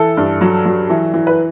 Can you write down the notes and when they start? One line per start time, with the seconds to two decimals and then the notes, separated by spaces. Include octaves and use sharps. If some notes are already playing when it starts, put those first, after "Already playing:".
Already playing: E3 A4
0.17 G2
0.41 F#3
0.66 F#3
0.90 E3
1.14 E3
1.27 B4